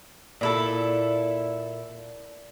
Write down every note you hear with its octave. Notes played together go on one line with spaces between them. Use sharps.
A#2 E4 A4